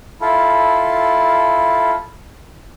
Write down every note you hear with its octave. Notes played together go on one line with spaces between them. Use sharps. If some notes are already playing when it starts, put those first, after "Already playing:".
E4 F4 A4